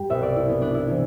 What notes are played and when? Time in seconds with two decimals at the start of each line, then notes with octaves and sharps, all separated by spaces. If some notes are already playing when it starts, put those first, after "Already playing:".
Already playing: G2 G4
0.09 C2 B2 E5
0.22 D5
0.36 E4
0.49 B3
0.62 D4
0.74 E4
0.89 C3 E3